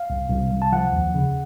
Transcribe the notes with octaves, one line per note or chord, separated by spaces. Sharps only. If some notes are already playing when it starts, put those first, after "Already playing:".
Already playing: F5
C2
C2
C2
A5
F3 F#5
D#2
C#3